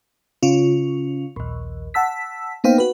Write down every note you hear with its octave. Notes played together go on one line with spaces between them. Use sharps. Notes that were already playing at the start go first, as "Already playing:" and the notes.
C#3 C#4 F4
A#1 D#2
F#5 A5 E6 B6
A#3 B3 D#4 C5 F5 G5
F#4 B4